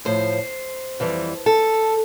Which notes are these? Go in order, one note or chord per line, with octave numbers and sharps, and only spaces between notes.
A2 F3 C5
F2 E3 G3
A4